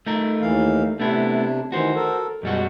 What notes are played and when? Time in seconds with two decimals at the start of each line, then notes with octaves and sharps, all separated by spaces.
0.07 A3 D#4 A#4
0.41 D#2 E3 F5
1.00 C3 A3 B3 D4 E4
1.72 D#3 E3 F#4 C5
1.96 A4 A#4
2.43 F#2 B2 G3 G#3 F#4